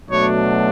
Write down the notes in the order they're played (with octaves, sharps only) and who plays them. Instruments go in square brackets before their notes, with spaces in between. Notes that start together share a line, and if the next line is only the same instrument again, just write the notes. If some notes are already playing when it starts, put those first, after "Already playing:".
[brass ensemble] B2 F#3 A3 D4 C#5